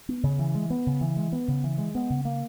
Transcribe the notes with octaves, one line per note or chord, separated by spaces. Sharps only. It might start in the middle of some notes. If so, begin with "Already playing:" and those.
B3
C#3
E3
G#3
B3
C#3
E3
G#3
B3
C#3
E3
G#3
B3
C#3
A#3